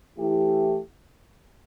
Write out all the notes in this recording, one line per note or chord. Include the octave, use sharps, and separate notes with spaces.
E3 A3 E4 G4